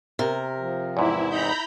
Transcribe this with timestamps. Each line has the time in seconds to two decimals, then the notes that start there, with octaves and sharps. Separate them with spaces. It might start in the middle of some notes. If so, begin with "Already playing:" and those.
0.19 C3 A#4
0.57 F3
0.97 E2 G#2 E4
1.29 D#4 A#5 B5 G6